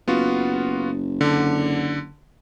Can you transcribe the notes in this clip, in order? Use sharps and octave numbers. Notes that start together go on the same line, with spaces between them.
F#1 B3 F4 F#4
D3